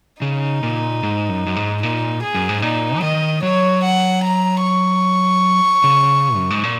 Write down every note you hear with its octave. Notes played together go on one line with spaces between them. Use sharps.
C#3 D#4
A#2
G#2
F#2
F#2
G#2
A#2 D#4
G#4
F#2
G#2
A#2 D#4
F#3
D#3 D#5
F#3 C#5
F#5
A#5
C#6
C#3
F#2
G#2
A#2